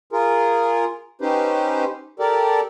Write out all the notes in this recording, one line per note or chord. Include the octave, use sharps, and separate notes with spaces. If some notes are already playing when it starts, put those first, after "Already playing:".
F4 G#4 A#4
C#4 D#4 G4 B4 C5
G4 A4 A#4 D5